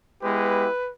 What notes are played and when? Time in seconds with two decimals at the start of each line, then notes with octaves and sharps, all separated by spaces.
0.22 G#3 B3 E4 G4 B4